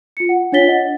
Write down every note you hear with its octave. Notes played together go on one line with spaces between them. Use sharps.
F4 C#7
F#5
D4 F4 C#5 A6 B6 G7
D#5 F#5